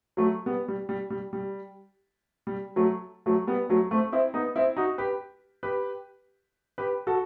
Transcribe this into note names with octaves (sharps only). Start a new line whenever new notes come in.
F#3 A3
G3 B3
G3
G3
G3
G3
G3
F#3 A3
F#3 A3
G3 B3
F#3 A3
A3 C4
C4 E4
B3 D#4
C4 E4
D#4 F#4
G4 B4
G4 B4
G4 B4
F#4 A4